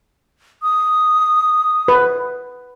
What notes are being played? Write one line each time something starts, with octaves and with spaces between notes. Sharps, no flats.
D#6
B4